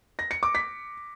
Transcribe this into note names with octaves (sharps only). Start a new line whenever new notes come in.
A#6
C#7
D6
B6